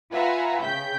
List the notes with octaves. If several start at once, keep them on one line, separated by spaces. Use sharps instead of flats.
F4 B4 E5 F#5 G#5 A#5
C#3 G5 G6 B6